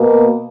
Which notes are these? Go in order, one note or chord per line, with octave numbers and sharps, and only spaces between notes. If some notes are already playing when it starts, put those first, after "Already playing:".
Already playing: B2 A#3